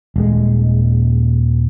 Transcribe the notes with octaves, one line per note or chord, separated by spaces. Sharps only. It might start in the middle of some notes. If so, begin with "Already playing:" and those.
D#1 G#3